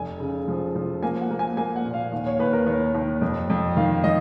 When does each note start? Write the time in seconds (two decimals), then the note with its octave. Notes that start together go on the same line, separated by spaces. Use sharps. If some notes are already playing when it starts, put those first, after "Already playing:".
Already playing: F1 G#5
0.20 C#3
0.48 F3
0.75 F3
1.03 A#3 G#5
1.21 F#5
1.31 A#3
1.39 G#5
1.57 A#3 G#5
1.76 F#5
1.85 A#2
1.94 F5
2.12 D#2
2.26 C#5
2.39 D#2 B4
2.53 A#4
2.67 D#2 C#5
2.95 D#2
3.22 F2
3.50 F2
3.77 D#3 F5
4.04 D#3 D#5